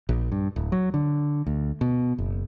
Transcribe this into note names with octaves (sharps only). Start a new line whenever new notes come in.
A#1
G2
D1
F#3
D3
D2
B2
F#1